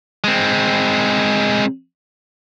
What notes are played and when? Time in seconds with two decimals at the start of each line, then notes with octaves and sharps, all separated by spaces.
0.24 G#3 C4